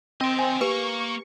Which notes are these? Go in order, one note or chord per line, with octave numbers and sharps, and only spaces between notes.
C4 D#5 G5
G#5
A#3 G4 B4 C#6